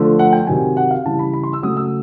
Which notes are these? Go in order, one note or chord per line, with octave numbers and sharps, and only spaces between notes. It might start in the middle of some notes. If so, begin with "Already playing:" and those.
Already playing: D3 F3 A3
F#5
G5
C3 D#3 F#3 G#5
F#5
F5
C#3 E3 G3 A5
B5
B5
C6
E6
C#3 F#3 A3 D#6
E6